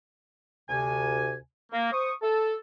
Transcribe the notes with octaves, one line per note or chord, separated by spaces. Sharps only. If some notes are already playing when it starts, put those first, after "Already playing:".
D2 C3 G#5
A#3
C5 C#6 D#6
A4